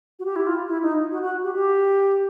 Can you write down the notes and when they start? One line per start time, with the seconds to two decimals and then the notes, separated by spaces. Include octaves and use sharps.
0.19 F#4
0.25 G4
0.36 E4
0.47 F4
0.68 E4
0.82 D#4
1.11 F#4
1.22 F#4
1.44 G4
1.55 G4